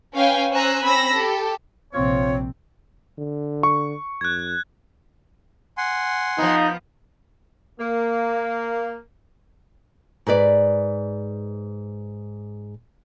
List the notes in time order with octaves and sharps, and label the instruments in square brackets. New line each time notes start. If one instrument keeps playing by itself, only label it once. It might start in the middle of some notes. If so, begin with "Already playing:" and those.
[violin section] C#4 B4 F5 G5 G#5
C#4 C5 G#5 A#5 E6 F#6
C4 C#4 B5 E6 A#6
G4 A4
[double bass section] A#1 C3 C4 [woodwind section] F4 C#5
[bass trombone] D3
[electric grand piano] C#6
[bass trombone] F2 [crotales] F#6 G#6
[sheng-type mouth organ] F#5 G#5 C6
[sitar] F3 B3 [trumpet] D#4
[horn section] A#3
[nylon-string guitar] G#2 G#4 B4 D5